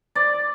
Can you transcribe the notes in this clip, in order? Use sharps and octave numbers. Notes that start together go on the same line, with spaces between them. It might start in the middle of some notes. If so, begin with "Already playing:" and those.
D5